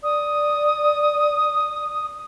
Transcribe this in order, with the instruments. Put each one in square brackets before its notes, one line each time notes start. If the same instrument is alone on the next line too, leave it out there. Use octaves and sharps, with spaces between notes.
[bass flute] D5 [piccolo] D#6